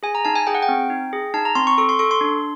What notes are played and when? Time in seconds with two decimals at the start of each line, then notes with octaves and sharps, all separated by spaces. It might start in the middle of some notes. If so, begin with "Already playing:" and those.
0.03 G#4 G#5
0.15 A#5
0.25 D#4 A5
0.35 G#5
0.47 G#4 G5
0.55 F#5
0.62 G5
0.69 C4
0.90 D#4
1.13 G#4
1.34 D#4 A5
1.45 A#5
1.55 C4 C6
1.67 C#6
1.78 A4 C#6
1.89 C6
1.99 A4 C#6
2.11 C6
2.21 D4